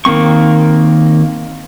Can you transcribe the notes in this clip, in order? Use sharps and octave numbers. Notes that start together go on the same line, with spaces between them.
D#3 A#3 C4 C#6